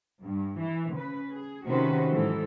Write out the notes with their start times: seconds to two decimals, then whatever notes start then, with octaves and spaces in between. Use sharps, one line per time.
0.22 G2
0.59 E3
0.94 C#3 B4
1.32 G#4
1.66 C3 D#3 C#4 F#4 B4 C5
2.11 G#2 E3 F#3 A4